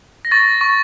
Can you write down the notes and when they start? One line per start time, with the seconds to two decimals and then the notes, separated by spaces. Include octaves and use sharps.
0.25 A#6
0.31 C#6 A6
0.61 C#6